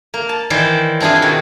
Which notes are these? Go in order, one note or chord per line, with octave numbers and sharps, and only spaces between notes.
A#3
A5
D#3 E3 E4 C5 D5
C4 D4 E4 F4 G#4
B2 D#3 F#4